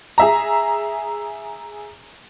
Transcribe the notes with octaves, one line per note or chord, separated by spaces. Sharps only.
G#4 E5 A#5